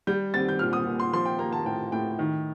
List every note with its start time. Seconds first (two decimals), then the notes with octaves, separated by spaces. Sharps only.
0.07 G3 G6
0.34 C4 A6
0.49 G6
0.59 A#2 F6
0.73 D#6
0.87 A#2
1.00 C6
1.13 F3 C6
1.26 G5
1.39 A#3 A#5
1.53 A5
1.66 A2 G5
1.92 A2 G5
2.19 D#3